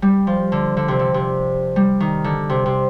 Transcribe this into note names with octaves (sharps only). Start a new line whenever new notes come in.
G3
F3
D3
D3
C3
D3
C3
G3
D#3
D3
C3
C3